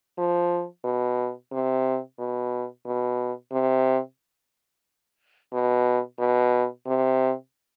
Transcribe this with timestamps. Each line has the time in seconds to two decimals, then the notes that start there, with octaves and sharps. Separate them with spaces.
0.18 F3
0.84 B2
1.52 C3
2.19 B2
2.86 B2
3.51 C3
5.52 B2
6.19 B2
6.86 C3